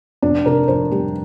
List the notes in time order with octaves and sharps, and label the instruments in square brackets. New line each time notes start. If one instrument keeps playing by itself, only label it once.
[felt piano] F1 D4
C3 A#4
F2 C5
G3 G4